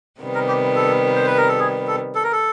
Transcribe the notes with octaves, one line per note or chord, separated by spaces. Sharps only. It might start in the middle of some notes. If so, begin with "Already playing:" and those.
C3 D#3 G3 B3
A#4
G4
A4
C5
B4
A#4
A4
G#4
A4
A4
A#4
A4